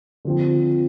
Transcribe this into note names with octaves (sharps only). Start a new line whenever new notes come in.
D3 F3 C4